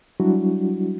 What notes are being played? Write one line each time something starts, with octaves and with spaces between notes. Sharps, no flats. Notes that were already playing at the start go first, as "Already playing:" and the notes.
F#3 G3 D4 E4 F#4